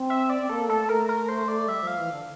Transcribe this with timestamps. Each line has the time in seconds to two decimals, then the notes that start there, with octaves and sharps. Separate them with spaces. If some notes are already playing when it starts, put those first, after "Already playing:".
Already playing: C4
0.10 E5
0.30 D5
0.42 C4
0.50 A#3 A4
0.69 A3 A4
0.89 A3 A#4
1.09 A#4
1.29 C5
1.48 D5
1.68 G3 E5
1.82 F3
1.87 F5
1.98 E3
2.12 D3